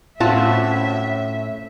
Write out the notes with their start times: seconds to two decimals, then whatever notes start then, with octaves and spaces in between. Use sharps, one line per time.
0.20 A2 C4 C#4 F4 F#4 E5 A5